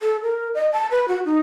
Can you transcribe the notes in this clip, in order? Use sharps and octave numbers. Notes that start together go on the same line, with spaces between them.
A4
A#4
D#5
A5
B4
F#4
D#4